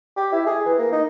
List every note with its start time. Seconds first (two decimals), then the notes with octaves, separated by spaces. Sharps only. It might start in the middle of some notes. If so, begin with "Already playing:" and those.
0.17 G4
0.32 E4
0.47 G#4
0.66 E3
0.78 A#3
0.92 D#4